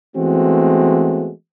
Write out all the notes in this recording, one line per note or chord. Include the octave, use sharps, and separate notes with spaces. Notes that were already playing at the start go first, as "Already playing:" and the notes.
E3 G#3 A3 B3 C4 F#4